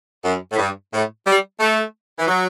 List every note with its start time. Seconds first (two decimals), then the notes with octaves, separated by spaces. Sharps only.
0.25 F#2
0.53 A2
0.59 G2
0.94 A2
1.27 G3
1.60 A3
2.19 E3
2.28 F#3